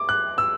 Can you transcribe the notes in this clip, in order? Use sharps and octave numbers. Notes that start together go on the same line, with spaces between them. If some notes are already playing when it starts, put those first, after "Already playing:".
Already playing: D6
F#6
E6